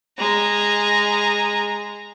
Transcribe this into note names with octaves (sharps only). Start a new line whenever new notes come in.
G#3 A#5